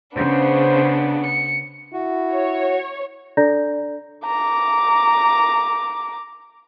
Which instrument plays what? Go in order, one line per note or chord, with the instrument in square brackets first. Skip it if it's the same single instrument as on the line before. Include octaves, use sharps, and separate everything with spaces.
[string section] C#3 [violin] B3 D4 [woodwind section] C5
[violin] C#7
[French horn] E4 [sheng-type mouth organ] F#4
[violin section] C#5
[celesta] D4 A4 D5 A#5 G6 A#6
[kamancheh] A#5 D6